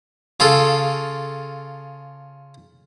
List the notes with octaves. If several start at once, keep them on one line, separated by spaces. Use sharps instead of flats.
C#3 F4 A4